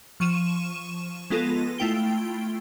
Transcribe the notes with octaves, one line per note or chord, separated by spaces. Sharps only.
F3 C#6 D#7 E7
G#3 B3 F4 A4 A#6 D#7
A3 E4 F4 G5 D7 G7